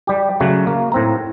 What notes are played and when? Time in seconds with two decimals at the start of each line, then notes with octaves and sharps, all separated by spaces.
0.07 G3 G4
0.40 C#3 F#3 A3 F#4
0.67 A#3
0.92 A2 C4 A#5